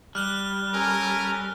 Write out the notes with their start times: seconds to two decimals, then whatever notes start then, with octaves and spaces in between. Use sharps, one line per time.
0.15 G3 F6 F#6 G7
0.74 C#4 A4 A#4 G#5